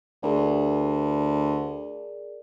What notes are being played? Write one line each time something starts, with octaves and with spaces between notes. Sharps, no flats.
D2 G#4 A#4 D5